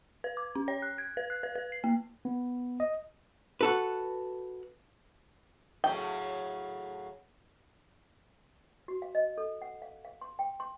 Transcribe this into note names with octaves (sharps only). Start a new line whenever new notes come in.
B4
D6
C#4
C#5
F#6
G#6
B4
F#6
B4
B4
C7
A#3
B3
D#5
F#4 A4 B4
A2 C#3 F#3 G5
F#4
F5
D#5
A4
F#5
F5
F5
C6
G5
C6